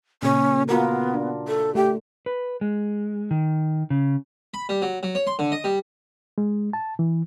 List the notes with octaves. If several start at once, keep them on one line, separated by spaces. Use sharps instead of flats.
A#2 C#3 C#4
B3 F4 F#4 A#4
D4
A4
A3 G4
B4
G#3
D#3
C#3
B5
G3
F#3
F#3
C#5
C6
D3
D#5
G3
G#3
A5
E3